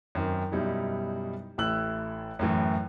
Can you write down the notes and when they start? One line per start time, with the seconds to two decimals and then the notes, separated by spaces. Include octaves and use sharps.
0.15 F#2 D#3 C4
0.52 F#2 B2 G3 D#4 E4
1.58 A1 A3 E4 E6 F#6 F#7
2.39 F#2 A2 E3